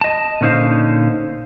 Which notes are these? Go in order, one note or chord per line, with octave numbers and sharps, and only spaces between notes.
D#5 A5
A#2 D3 C#4 D#4 C5 F5